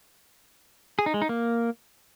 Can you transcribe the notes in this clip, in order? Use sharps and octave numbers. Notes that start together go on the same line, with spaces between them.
G#4
D#4
G#3
D#4
A#3